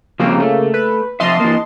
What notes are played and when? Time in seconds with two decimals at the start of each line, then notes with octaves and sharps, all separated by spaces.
0.20 C#3 F3 G3 A#3 C4
0.40 A3
0.74 B4
1.20 C3 F3 D#5 E5 A5 C6
1.40 E3 A#3